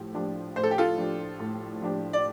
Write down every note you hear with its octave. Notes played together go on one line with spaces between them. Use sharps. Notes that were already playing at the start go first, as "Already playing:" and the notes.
Already playing: A2 F3 G4
F3 D4 G4
A2 C5
A4
G4
F4 A4
F3 D4 G4
A2
F3 D4 G4
D5